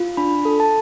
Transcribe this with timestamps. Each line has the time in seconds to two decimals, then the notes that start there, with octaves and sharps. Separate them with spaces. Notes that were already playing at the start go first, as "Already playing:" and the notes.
Already playing: F4
0.17 D4 B5
0.45 A4
0.60 A5